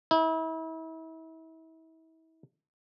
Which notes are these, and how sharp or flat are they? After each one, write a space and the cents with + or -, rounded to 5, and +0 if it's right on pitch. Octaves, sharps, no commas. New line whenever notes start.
E4 -35